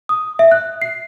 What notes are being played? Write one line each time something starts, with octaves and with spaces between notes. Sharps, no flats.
D#6
E5
F#6
C7